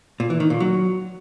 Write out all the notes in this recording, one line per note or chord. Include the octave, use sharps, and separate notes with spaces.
A#2
E3
D#3
A#2
F#3